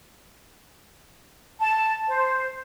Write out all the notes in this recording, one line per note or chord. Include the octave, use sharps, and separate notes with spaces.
A5
C5